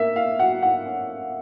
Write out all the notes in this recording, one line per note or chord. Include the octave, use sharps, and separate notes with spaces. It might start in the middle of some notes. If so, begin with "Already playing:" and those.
Already playing: A#3 E5
F5
F#3 F#5
F#5
C#4